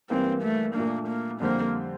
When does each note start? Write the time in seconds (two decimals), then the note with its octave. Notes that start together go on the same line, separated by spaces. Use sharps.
0.10 G2 E3 A#3 C4
0.43 A3
0.75 A#2 A3 A#3 D4
1.08 A#3
1.40 F2 D3 G3 A#3 C4 G4